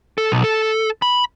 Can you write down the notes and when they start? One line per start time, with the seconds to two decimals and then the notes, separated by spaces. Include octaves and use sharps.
0.18 A4
0.32 B1
0.44 A4
1.02 B5